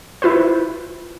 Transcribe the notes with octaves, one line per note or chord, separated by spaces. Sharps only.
E4 F4 B4 C5